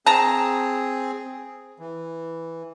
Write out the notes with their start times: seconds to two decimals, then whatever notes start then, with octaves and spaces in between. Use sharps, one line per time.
0.06 C4 G#4 A5 A#5
1.79 E3